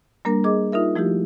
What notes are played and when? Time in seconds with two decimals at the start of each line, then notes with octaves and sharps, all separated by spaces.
0.25 G3 A#3 D4 A#4
0.44 G#4 D#5 D6
0.72 D#4 F4 A#4 E5
0.96 F3 A3 E4 F#4 G4